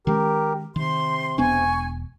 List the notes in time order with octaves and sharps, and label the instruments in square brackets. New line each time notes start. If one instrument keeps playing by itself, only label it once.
[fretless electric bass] D#3 G#3 C#4 [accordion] G4 A#4
[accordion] C3 [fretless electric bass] D#3 [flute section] C6
[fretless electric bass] E1 B3 D4 [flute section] G#5 C#6